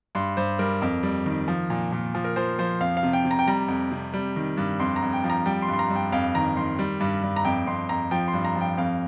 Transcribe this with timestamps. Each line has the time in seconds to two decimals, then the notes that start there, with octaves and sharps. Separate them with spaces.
0.15 G2 C6
0.37 G2 C5
0.59 G3 A#4
0.82 F2
1.03 G3
1.26 D#3
1.48 F3
1.70 A#2
1.92 A#2
2.15 F3
2.24 A#4
2.36 F3 C5
2.59 F3 C5
2.81 F2 F5
2.97 F5
3.03 C3
3.13 G5
3.25 C3
3.31 A#5
3.39 G5
3.47 G3 A#5
3.68 F2
3.91 C3
4.14 G3
4.36 D#3
4.57 G2
4.80 F2 C6
4.96 A#5
5.02 F2
5.13 G5
5.24 F3
5.30 A#5
5.46 G3 G5
5.62 C6
5.68 G2
5.73 C6
5.79 A#5
5.90 G2
5.96 G5
6.12 F2 F5
6.35 D#3 A#5
6.57 D#3 C6
6.79 G3
7.00 G2
7.23 G2
7.36 A#5
7.45 F2 G5
7.67 F2 C6
7.89 F2 A#5
8.11 F3 G5
8.28 C6
8.33 G2
8.45 A#5
8.56 F3 G5
8.78 F2 F5